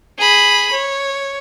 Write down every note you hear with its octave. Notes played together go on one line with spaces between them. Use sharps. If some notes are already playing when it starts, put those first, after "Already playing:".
G#4 B5
C#5